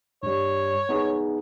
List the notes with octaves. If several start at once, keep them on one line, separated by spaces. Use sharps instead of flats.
G2 G3 C#5
B3 D#4 G#4